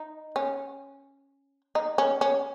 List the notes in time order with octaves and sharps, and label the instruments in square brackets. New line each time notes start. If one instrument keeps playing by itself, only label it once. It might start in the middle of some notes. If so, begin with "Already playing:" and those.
Already playing: [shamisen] D#4
C#4
D#4
C#4
C#4